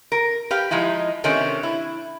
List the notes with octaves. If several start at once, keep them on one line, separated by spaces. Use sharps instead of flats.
A#4
G4 B4 F5
F3 G#3 D#4 E4
C3 D#3 A3 C#4 D4
E4